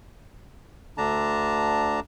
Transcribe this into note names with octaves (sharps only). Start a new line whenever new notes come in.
D2 D3 D4 A5 A#5